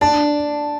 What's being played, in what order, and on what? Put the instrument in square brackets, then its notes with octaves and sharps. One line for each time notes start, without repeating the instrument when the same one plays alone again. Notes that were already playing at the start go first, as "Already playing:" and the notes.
[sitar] D4 [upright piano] A5